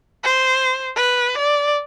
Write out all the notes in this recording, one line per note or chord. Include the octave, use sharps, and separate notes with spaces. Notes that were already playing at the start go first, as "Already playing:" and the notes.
C5
B4
D5